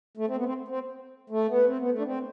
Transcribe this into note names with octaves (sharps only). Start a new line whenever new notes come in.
A3
C4
B3
C4
C4
A3
B3
C4
B3
A3
D4
C4